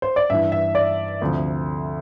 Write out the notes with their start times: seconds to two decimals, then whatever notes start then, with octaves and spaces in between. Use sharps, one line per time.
0.02 C5
0.16 D5
0.30 G2 E3 E5
0.52 E5
0.75 D5
1.22 D2 C3 F3